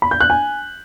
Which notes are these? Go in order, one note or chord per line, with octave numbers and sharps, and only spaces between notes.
B5
G6
F#6
G#5